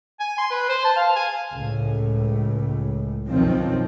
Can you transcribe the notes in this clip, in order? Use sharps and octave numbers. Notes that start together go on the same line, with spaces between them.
G#5
C6
B4
C5
A5
F5
G#5
C#2 A2
B1 F#2 D#3 F3 C4